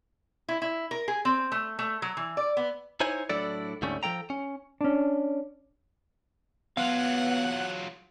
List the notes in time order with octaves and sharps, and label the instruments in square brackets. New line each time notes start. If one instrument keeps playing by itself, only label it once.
[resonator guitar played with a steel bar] E4
E4
A#4
G#4
C4
A3
A3
F#3
E3
D5
B3
[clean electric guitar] D#4 E4 C5 C#5 G#5
A2 F#3 D4 E4 A4 D5
D2 G#2 D3 G3 A3 C#4
F3 A#3 A4 G5 A#5
C#4
[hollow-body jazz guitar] C#4 D4
[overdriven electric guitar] F#3 F4 [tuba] B3 [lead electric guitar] F5 [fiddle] F#5